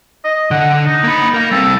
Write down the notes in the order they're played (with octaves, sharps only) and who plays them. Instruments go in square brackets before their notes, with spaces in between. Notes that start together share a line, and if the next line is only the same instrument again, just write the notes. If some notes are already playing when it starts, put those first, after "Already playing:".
[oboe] D#5
[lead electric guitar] D3 [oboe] F#5
[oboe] D#4
[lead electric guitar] A#3 B5
A#4 F5
[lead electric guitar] G3 C4 [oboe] A4